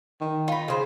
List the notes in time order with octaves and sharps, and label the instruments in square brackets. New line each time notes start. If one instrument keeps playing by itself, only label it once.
[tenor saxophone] D#3
[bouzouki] D#4 [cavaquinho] F4 B5
[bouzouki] C#3 C5 [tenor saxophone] G#4